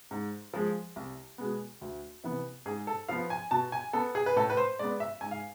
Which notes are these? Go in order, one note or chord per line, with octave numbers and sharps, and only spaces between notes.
G#2
F3 G#3
C2
B2 G#3 B3
D2
C3 E3 B3
G#2 G#4
A4
F3 B3 F5
G#5
B2 A5
G#5
B3 A4
G#4
B4
A2 A4
B4
C5
G#3 B3 D5
E5
G#2 G#5
F5